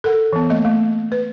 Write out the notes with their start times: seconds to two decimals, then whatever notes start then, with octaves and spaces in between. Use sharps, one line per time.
0.04 A4 A#4 F#5
0.33 E3 B3
0.50 A3 A#3 D#5
0.65 A3
1.12 B4